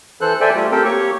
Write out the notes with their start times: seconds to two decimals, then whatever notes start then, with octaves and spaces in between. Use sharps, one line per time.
0.21 E3 A4 C5 F#6
0.41 A4 C5 D5 E5 G5 G#5
0.55 G3 A3 F4 G4
0.71 C4 G4 A4 A#4 C5 G5
0.85 A#3 G4 C#5 C#6